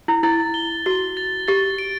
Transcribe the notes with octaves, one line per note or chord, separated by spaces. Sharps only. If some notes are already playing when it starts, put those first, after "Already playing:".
E4
E4 A6
G7
F#4 G7
A6
G4 A6
D7